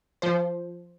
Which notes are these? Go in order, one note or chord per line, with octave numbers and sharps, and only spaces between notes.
F3 C5